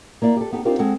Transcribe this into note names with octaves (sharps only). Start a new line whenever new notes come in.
A#3 E4 D5
G4 A4
B3 D#4 G4 A4
C4 D4 D#4 F4 G4 A#4
G#3 C4 A4 F#5